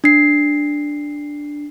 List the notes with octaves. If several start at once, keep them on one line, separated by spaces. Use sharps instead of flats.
D4 C7